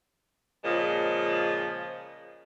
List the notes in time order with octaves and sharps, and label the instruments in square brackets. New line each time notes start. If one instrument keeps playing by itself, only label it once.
[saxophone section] A#2 C#3 F3 G#3